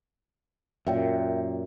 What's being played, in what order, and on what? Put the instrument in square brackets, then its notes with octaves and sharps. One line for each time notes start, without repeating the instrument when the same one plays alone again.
[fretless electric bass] F#2 A#2 [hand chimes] E5 G5